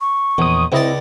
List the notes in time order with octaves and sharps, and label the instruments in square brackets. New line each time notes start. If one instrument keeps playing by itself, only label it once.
[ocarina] C#6
[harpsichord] A#1 [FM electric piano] E2 D#6
[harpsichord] C#2 D5 [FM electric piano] C4 E4 D#5